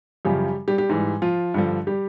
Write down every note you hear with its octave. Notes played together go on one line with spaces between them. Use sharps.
F#2 C#3 F3 G3 G4
G3 G4
G3 G4
G#2 E3 G3
F3 F4
G2 D3 F3
G3 G4